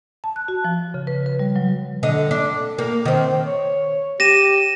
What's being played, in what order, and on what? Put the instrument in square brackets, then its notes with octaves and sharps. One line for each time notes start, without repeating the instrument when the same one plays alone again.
[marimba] A5
F#6
F#4
F3
C#3
B4
B4
G3
F#3
[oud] D3 D#5
D4
A#3
D#3 C4
[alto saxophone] C#5
[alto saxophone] G4 [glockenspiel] A#6 D#7 E7